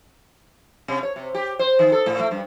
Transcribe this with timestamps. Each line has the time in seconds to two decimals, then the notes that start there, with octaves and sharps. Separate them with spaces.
0.88 C3
1.03 C#5
1.16 C3
1.34 G4
1.59 C5
1.79 D#3
1.92 A4
2.06 A2
2.20 A3
2.31 G2